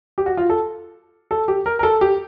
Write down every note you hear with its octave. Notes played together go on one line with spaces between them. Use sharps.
G4
F#4
F4
A4
A4
G4
A#4
A#4
A4
G4